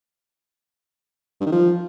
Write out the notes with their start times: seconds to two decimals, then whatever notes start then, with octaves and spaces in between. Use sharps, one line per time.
1.41 G2
1.46 D#3
1.52 F3